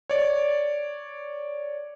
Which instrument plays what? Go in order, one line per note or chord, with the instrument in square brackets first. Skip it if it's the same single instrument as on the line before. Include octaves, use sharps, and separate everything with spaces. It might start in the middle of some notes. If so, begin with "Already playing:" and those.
[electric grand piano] C#5 D5